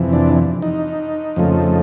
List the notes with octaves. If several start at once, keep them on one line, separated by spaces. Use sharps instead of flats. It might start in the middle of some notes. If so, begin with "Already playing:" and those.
Already playing: F2 C3 E3
D4
D#4
F2 C#3 F3 A3